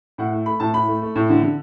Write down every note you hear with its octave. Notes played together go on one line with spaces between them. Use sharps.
A2 F#5
A3
A3 B5
A2 A5
A2 B5
A3
A3
A2
D3
D3